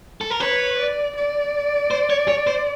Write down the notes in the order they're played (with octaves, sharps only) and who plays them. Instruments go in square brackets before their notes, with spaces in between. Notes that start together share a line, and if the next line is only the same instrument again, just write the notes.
[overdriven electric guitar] A4
A#4
[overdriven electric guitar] B4 [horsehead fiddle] C#5
[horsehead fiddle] D5
D5
[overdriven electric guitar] C5
C#5
C#5
C5